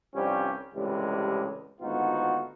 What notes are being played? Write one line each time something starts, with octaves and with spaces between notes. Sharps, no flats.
C2 G2 F3 G3 C#4 G4
C#2 A2 C3 E3 G3 G#3
G#1 D2 B3 D#4 F4 F#4